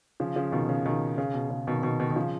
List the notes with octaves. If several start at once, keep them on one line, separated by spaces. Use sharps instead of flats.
C#3 F3
C#3 F3
B2 D#3
C#3
B2 D#3
C#3
B2
C#3
B2 D#3
B2 D#3
B2 D#3
D#3
C#3 F3